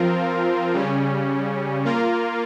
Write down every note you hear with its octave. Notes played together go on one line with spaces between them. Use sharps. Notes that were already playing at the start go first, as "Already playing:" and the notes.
Already playing: F3 C4 F4 A#4
C#3 G3 C#4
A#3 F4 A#4